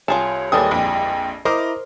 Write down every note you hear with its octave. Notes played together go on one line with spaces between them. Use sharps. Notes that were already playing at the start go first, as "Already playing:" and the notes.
C2 F4 G#4 C#5 A5
D#2 E3 G3 G#3 A4 D#6
A#1 F2 G5
E4 A#4 C5 D#5 A#5 D6